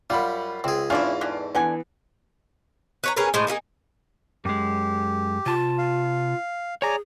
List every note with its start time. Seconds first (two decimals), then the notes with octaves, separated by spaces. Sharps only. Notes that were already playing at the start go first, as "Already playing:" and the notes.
0.10 F#2 G3 F4 F#5 B5
0.64 C#2 C4 G#4
0.90 E2 G#2 C#4 D4 E4 F4
1.21 D3 E3 D4
1.55 D3 E3 B3 F#5 G#5
3.04 B4 C#5 A#5
3.17 C#4 G#4 A#4 B4
3.34 A2 G#3 C5
3.47 A#3 D#4 F4 G#4
4.45 F#2 G#3 G4
5.46 C3 F4 A5
5.78 F5
6.82 G#4 C#5 D5 G#5 A#5